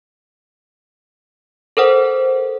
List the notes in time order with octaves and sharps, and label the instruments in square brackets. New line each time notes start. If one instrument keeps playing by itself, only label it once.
[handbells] A4 A#4 C5 F#5